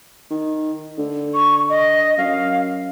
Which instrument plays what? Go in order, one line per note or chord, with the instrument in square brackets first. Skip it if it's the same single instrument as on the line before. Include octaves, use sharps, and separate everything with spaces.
[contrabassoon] D#3
D3
[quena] C#6
D#5
[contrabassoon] F#2 [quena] F5